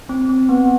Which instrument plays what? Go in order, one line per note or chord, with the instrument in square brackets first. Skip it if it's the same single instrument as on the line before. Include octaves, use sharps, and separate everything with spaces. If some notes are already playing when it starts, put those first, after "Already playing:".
[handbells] C4
C4
B3